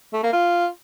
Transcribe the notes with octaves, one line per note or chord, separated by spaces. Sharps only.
A3
A#3
F4